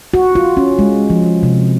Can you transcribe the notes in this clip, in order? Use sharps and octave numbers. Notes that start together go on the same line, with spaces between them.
F#4
F4
C#4
G#3
F3
C3